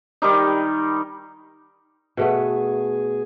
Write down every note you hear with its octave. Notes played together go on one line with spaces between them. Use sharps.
D#3 G3 D#4
B2 A3 B3 G#4